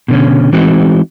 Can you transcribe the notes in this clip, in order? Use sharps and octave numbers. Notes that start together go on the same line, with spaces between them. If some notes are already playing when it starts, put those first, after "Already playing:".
B2 D3 C#4
E3 G#3 C4 D#4 F#4